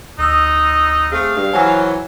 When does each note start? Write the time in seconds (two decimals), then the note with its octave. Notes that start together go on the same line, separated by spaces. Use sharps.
0.18 D2 D#4 D#6 E6
1.12 A3 C4 G#4 F5
1.35 G2
1.53 E3 F#3 C5 F#5 G#5